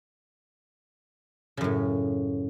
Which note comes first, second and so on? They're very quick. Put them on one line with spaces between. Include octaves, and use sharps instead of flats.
C#3 F#2 A2